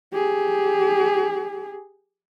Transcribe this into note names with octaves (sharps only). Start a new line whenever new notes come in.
G4 G#4